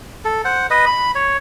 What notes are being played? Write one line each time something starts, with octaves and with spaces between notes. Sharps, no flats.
A4
C5 F#5
B4 D#5
B5
C#5